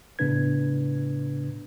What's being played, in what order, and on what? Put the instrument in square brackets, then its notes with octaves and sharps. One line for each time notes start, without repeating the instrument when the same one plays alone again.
[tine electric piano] A2 C#3 B3 D4 B4 G#6